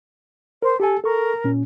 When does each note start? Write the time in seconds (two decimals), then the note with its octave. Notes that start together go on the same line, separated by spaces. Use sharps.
0.62 A#4 C5
0.80 G4 A4 G#5
1.04 A4 A#4 C#6
1.44 A#2 C#4